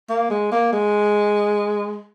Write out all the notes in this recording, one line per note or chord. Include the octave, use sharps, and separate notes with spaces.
A#3
G#3
A#3
G#3